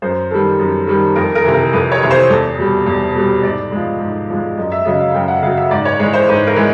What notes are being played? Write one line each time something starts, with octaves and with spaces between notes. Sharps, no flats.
F#2 C5
D#3 G3 A4
F#2
D#3 G3
F2 A#4
A#4
C3 E3
A#4
F2 B4
C#5
C3 E3
C5
E2 A4
B2 G3
E2
B2 G3
G#2 D5
F3 G#3
G#2
F3 G#3
F#2 D#5
E5
C#3 F#3 D#5
F5
F#2 G5
F#5
C#3 F#3 F5
E5
G#2 D5
C#5
E3 G#3 C#5
C5
G#2 B4
A#4
E3 G#3